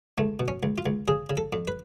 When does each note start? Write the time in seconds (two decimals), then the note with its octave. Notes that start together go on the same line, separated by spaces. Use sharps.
0.18 C#2 A3
0.40 B2
0.48 C#4
0.63 C#2
0.78 F4
0.86 C#2
1.08 C#3 G#4
1.30 C#3
1.37 A4
1.53 F2
1.68 B4